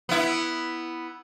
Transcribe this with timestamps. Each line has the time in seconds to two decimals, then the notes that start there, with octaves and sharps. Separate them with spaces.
0.09 B3 E4